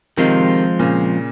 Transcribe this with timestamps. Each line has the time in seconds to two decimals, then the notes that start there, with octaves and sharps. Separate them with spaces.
0.17 C3 D#3 F3 G#3 C4 F4
0.79 A#2 C#3